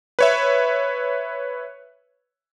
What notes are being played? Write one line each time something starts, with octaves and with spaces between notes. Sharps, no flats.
B4 C#5 E5